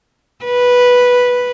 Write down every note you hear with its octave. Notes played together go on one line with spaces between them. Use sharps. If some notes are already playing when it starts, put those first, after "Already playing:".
B4